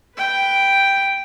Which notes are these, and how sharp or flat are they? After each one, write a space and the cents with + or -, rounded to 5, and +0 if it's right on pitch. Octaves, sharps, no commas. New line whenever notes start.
B4 +0 G5 +0